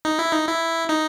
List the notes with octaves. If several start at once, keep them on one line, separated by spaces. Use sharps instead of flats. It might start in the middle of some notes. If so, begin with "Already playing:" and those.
D#4
E4
D#4
E4
D#4